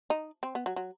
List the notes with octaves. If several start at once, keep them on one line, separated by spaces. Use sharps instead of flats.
D#4
C4
B3
F#3
F#3